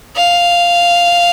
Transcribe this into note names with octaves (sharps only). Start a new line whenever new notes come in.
F5